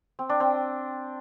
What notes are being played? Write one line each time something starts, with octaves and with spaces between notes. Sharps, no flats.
C4
D4
C4